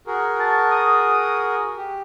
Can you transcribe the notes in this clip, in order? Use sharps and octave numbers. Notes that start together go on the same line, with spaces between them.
F#4 G#4 A#4
A5
D#6
G4